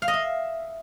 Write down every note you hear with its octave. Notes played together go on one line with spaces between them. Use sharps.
F5
D#5
E5